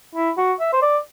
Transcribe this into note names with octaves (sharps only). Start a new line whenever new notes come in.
E4
F#4
E5
C5
D5